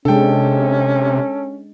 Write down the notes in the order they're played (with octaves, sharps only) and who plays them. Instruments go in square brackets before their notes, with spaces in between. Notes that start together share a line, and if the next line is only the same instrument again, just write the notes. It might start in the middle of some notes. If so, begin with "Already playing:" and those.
[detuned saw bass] C3 [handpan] G#3 D4 [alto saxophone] C#4 [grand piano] A4 G5